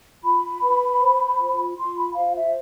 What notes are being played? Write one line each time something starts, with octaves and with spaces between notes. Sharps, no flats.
F4 B5
B4
C5
F4
F4 C6
B5
C5 F5
E5